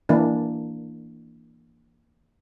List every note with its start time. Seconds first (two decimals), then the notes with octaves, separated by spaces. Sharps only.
0.09 E3 A#3 D4